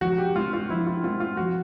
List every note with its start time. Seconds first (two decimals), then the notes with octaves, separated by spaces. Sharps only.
0.01 F3 F#4
0.18 G4
0.35 G#3 C4 F4
0.53 F4
0.70 F3 E4
0.87 F4
1.04 G#3 C4 F4
1.20 F4
1.37 F3 F#4